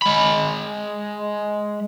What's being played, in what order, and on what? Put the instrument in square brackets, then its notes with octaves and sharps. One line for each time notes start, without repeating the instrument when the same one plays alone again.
[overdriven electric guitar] G#3 B5